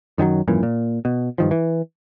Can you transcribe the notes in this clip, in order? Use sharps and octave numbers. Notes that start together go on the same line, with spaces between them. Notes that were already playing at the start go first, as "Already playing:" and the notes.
F#2 D#3 E3 F#3
G#1 F#2 A#2 E3
A#2
B2
G2 D#3 F3
E3